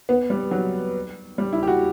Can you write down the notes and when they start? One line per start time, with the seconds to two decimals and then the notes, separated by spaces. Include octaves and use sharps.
0.09 B3
0.30 G3
0.51 F#3
1.38 G3
1.53 E4
1.63 G4
1.67 F#4